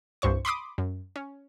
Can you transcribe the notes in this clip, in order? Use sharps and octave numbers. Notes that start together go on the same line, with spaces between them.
C2 G2 C5 C#6
B5 C6 D6 D#6
F#2
C#4